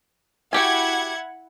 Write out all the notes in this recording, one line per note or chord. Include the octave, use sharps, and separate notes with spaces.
E4 F#4 G4 F#5 G#5 G#6